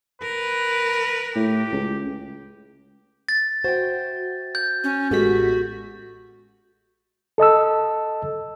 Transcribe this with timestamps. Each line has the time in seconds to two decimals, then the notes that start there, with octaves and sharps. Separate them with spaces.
0.22 A#4 B4
1.36 A2 G4
1.72 C#2
3.29 A6
3.64 F#4 C5 E5 G5
4.55 G6
4.84 C#4
5.11 A1 G#3 B3 F#4 G4 A4 B6
7.38 A4 D#5 A5 E6